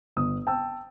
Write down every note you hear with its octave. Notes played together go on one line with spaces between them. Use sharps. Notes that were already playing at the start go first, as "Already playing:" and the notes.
G1 D#6
G5 A5 E6